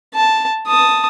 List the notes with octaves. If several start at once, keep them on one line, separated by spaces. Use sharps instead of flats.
A5
A5 D#6